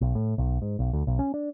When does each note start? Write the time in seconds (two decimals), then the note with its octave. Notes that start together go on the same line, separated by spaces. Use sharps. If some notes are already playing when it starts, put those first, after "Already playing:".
0.01 B1
0.15 A2
0.38 B1
0.62 G#2
0.79 B1
0.93 D2
1.07 B1
1.19 C#4
1.34 D4